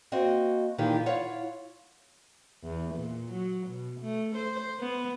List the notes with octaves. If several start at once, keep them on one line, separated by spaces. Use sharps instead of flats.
A#3 C4 F#4 D#5
A#2 D#3 E3 F4 G4 G#4
E4 F4 C#5 F5 F#5
E2
A#2
F#3
B2
A3
C5
B3